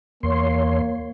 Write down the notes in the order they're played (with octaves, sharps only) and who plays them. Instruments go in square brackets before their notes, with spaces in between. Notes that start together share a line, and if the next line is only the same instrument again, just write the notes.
[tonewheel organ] E2 C#5 C6 [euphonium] A#3